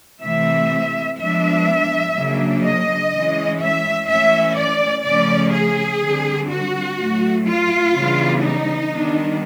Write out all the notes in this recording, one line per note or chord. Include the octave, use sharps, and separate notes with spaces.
C3 E3 A3 C4 E5
F3 G#3 B3 D4 E5
C#3 F#3 A#3 D4
D#5
E3 G#3 C#4
E5
E3 A3 C#4 E5
D5
C#3 F3 A3 C#4 D5
G#4
D3 G3 C4
F#4
A2 F#3 A3
F4
C#3 E3 G3 B3 D4
D#4
D#3 G3 B3 D4